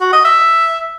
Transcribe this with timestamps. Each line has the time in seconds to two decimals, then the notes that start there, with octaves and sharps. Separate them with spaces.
0.01 F#4
0.13 D#5
0.25 E5